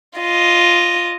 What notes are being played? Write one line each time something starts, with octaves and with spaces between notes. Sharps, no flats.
F4 D#5